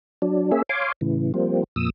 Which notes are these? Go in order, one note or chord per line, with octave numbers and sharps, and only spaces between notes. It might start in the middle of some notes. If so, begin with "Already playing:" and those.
F#3 D4
A#3 C#4 G#4 E5
C#5 F5 G#5 C6 D6
A2 C#3 E3
F3 G3 A#3 C4
F2 A#2 D#6 E6